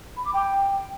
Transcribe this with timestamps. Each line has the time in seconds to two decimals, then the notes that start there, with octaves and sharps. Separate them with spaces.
0.17 B5
0.25 D6
0.34 G5